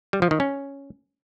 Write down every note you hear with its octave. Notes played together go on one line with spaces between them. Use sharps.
G3
F3
D#3
C#4